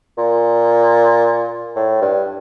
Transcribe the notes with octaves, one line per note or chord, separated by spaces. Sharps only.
A#2
A2
G2